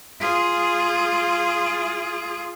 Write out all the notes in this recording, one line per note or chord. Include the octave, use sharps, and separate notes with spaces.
F4 G#4